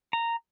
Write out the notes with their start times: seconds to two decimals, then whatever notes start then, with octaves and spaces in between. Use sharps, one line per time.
0.13 A#5